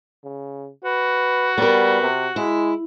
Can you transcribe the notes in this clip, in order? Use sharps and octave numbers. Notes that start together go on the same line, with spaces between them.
C#3
F#4 B4
G3 B3 A#4
C3
G#3 E4